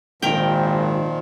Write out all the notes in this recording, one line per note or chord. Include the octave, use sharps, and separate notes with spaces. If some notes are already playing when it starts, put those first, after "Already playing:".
G#1 A#2 D#3 F3 A#4 G5